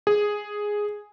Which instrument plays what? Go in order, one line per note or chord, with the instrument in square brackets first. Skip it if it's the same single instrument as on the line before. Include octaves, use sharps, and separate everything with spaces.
[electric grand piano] G#4